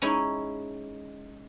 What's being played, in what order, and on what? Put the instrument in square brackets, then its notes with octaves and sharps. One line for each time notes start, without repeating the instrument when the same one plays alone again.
[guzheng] G#3 C#4 D#4 E4 G#5